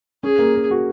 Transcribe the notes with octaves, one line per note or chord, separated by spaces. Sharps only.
C#4 G#4
A#3
A#4
F#4